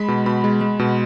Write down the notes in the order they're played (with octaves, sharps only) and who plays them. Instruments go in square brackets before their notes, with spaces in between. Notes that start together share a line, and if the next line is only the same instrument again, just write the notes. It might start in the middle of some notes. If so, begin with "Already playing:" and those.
Already playing: [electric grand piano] G#3 B5
B2
B2 B5
G#3
G#3
B2